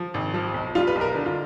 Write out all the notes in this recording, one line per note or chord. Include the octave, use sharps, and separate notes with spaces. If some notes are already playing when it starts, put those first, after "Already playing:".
Already playing: F3
G#1
F3
B1
G3 F4
B4
B1
A#4
D3
F4